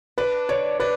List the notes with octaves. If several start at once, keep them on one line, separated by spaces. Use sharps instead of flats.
D4 B4
D3 C#5
D4 B4